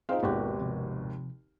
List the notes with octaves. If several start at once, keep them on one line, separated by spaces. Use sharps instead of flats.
C4 D#4 F4 G#4 C5 F5
G#1 D#2 B2 F#4 G4
C3 F3